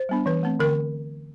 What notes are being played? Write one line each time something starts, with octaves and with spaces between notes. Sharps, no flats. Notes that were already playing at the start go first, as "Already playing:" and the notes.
Already playing: C5
G3 B3 D4
E3 B4
A3 C4
D3 A#4